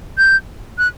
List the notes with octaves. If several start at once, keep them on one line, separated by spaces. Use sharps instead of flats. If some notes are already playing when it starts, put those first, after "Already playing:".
G6
F#6